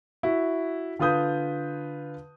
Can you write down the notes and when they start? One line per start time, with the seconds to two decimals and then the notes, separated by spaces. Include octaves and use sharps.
0.23 E4 F#4
0.99 D3 F4 B4 D#6 G6